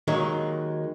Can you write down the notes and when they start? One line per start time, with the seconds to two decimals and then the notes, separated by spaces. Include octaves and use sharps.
0.08 D#2 D#3 F#3 G#3